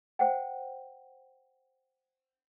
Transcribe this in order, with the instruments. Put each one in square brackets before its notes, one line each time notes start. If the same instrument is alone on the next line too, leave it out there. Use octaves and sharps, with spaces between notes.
[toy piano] C5 F#5 G5